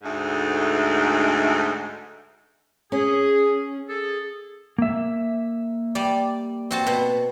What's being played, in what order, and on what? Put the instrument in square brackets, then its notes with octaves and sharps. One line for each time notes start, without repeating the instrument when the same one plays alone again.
[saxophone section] D2 G#2 A3 D#4
[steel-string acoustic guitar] C#4 [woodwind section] G#4
[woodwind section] G#4 A4
[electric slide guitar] A#3 E5
[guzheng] G3 D5
C4 F#4 A5
B2 F#5